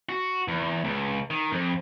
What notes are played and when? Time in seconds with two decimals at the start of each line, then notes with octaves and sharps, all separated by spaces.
0.09 F#4
0.48 E2
0.84 C#2
1.30 D#3
1.52 F2